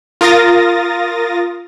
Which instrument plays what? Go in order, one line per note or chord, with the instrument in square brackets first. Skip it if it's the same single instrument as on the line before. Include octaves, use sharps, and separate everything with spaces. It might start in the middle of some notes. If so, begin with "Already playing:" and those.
[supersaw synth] F4 A#4 D#6 A6 A#6